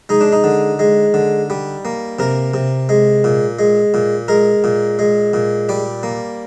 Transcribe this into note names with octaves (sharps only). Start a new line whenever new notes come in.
G#3 D#4
D4
D#4
D3
G#3
D3
G3
A#3
C3 A#4
C3
G#3
A#2
G#3
A#2
G#3 A#4
A#2
G#3
A#2
G3 D5
A#3